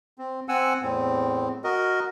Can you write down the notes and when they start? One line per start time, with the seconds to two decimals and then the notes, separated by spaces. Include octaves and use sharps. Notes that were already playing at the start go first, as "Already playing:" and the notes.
0.18 C4
0.48 C4 F#5 G#5 E6
0.82 E2 A2 C4
1.64 F#4 A#4 D#5